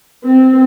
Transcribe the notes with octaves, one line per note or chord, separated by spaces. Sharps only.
C4